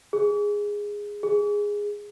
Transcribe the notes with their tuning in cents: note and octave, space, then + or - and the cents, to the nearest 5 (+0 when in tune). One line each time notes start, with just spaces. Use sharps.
G#4 -10
G#4 -10